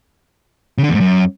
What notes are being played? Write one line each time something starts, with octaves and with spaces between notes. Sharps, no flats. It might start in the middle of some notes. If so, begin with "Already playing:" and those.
C#3
D3
E2
G#2
F#2